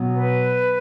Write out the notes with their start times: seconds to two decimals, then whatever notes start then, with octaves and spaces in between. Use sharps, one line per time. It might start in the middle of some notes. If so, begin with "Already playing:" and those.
Already playing: B2 F#3 B3
0.15 B4